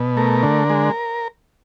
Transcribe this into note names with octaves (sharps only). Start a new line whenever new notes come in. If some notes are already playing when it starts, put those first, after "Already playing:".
Already playing: B2
A3 A#4
D3
G#3